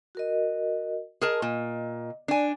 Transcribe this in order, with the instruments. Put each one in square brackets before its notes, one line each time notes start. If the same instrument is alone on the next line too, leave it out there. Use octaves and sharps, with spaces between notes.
[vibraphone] F#4 A#4 D#5
[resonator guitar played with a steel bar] G#4 A#4 A5 [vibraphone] D#5
[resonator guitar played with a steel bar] A#2
[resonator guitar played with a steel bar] D4 G#5 [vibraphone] D5